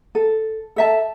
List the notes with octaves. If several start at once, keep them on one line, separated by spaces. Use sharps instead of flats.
A4
A4 E5 A5